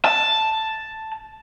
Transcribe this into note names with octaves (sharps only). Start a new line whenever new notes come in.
A5